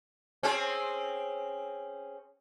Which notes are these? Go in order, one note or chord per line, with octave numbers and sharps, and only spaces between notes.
C4 C#4 G#4